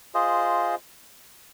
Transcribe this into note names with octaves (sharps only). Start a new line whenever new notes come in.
F4 G#4 C5 D#5